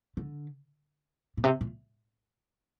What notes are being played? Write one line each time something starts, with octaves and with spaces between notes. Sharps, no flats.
D3
A#2
C3
A#2